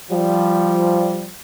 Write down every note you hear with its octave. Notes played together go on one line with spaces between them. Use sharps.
F3 G3